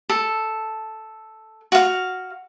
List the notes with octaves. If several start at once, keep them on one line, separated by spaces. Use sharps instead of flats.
A4
F#4 F5